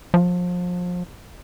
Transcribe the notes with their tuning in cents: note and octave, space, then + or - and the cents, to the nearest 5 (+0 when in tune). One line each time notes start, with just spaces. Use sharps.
F3 +30